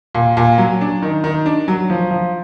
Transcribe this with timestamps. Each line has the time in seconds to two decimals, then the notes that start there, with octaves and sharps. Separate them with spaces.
0.15 A#2
0.37 A#2
0.58 F#3
0.81 D4
1.02 D#3
1.24 D#3
1.46 D4
1.68 F#3
1.90 F3
2.11 F3